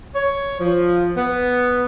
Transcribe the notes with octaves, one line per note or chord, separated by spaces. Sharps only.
C#5
F3
B3